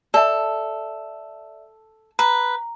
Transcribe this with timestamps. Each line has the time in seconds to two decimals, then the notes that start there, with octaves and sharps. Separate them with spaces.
0.14 A4 D5 E5
2.19 B4 A#5